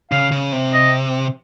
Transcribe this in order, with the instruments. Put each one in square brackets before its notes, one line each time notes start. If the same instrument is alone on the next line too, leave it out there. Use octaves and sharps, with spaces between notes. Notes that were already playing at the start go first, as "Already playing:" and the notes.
[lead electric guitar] C#3 [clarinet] F5
[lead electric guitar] C#3
C3
[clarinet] D#5